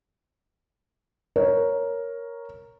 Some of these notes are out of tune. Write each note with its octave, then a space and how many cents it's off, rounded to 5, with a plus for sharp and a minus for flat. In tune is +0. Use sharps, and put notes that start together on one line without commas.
A#4 +5 C#5 +0